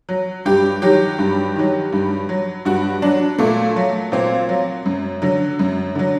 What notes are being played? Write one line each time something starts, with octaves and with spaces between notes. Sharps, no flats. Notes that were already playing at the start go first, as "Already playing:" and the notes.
F#3
G2 G4
D#3 F#3 G4
G2
D#3 F#3
G2
F#3
G2 F#4
F#3 D4
A#2 A3
F#3
A#2 C4
F#3
F#2
D3 F#3
F#2
D3 F#3